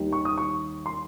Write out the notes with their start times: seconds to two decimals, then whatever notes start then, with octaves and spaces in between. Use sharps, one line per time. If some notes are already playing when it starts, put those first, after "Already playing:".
Already playing: D#2 D#3 G3
0.13 C#6
0.25 D#6
0.38 C#6
0.86 C6